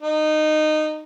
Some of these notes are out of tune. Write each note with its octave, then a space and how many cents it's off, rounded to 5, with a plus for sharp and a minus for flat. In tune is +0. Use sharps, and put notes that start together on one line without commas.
D#4 -15